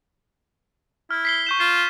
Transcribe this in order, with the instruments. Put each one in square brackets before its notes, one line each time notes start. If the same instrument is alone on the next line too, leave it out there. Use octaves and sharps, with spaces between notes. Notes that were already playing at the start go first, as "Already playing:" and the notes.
[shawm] E4 [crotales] F6
[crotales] B6 C7 G7
C#6 G6 E7
[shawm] F4 [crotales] C7 E7